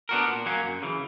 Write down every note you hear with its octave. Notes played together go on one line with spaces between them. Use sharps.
B3 D4 F#4 A#4
A#2
F#3 A#3 C#4
F#2
C#3 E3